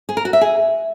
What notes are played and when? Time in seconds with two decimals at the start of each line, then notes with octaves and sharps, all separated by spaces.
0.09 G#4
0.17 A#4
0.25 F#4
0.33 E5
0.41 G#4